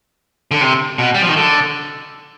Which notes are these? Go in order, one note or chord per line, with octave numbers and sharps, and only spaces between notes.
D3
C3
B2
G3
F3
D#3
D3